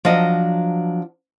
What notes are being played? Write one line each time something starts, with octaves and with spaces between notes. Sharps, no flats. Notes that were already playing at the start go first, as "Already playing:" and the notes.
F3 F#3 D4 D#5